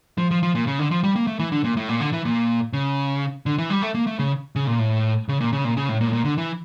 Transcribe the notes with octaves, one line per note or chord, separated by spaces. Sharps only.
F3
F3
F3
A#2
C#3
D3
F3
G3
A#3
A3
E3
D3
A#2
A2
A#2
D3
E3
A#2
C#3
D3
E3
G3
A3
A#3
A3
C#3
C#3
A#2
A2
C#3
A#2
C#3
A#2
C#3
A2
A#2
A2
A#2
D3
E3